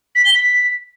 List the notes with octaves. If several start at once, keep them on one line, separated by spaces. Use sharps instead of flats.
B6
G7
B6